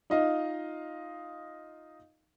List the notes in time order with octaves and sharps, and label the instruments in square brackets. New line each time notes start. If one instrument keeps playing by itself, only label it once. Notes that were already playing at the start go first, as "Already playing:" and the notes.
[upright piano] D#4 F4 D#5 F5